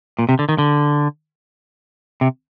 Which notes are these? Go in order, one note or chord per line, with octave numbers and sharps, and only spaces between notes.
A#2
C3
D3
D#3
D3
C3